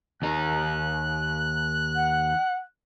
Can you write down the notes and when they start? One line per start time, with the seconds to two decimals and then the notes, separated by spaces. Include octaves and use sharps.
0.22 D#2 D#4 F#6
1.96 F#5